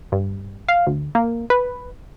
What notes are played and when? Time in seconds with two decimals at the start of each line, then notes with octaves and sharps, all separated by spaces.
0.12 G2
0.68 F5
0.87 D2
1.15 A#3
1.50 B4